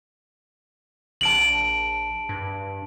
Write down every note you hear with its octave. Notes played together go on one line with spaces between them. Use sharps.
A#1 A5 D7 F#7
G2